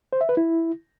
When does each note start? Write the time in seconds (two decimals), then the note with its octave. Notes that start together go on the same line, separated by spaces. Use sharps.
0.13 C5
0.21 E5
0.29 B4
0.37 E4